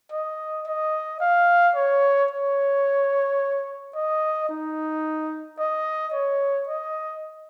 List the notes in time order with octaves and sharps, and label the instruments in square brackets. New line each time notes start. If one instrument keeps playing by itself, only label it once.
[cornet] D#5
D#5
F5
C#5
C#5
D#5
D#4
D#5
C#5
D#5